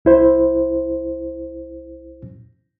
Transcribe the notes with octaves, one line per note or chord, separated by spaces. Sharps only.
C2 E4 C5